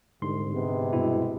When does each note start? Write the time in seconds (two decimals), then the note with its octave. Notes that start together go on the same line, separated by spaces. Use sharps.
0.22 C2 G#2 D3 C6
0.54 C3 G#3 B3
0.93 G2 B2 E4